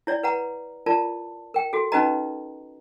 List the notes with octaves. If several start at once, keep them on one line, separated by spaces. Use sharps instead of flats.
E4 C#5 D5
B4 F#5 A#5
F4 A#4 D5 A5
A#4 G5
F#4 A4
C#4 D#4 F#4 B4 D#5 A#5